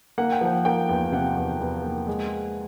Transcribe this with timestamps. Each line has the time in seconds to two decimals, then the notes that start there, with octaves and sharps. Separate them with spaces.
0.18 A#3 F#5
0.32 G5
0.41 F3 F#5
0.65 A#3 G5
0.89 E2
1.12 C3 F#5
1.37 E2
1.60 E2
1.84 A#3
2.08 G#3